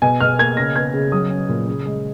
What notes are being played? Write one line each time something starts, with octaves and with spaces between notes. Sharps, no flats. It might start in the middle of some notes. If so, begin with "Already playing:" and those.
B2 G#5
B2 F6
A#3 G#6
C#3 A#6
B3 G#6
C#3
F#3 D#6
C#4
A#2
C#3
G#3